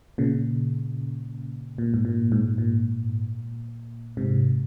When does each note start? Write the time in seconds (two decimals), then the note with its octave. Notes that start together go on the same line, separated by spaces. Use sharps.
0.18 A#2 C#3
1.78 A#2
1.94 G#2
2.05 A#2
2.32 G#2
2.58 A#2
4.17 G#2 C3